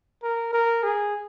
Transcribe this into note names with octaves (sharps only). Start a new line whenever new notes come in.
A#4
A#4
G#4